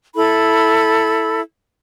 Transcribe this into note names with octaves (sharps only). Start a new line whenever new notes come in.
E4 A4 B5